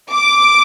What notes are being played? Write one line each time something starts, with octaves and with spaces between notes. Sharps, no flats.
D6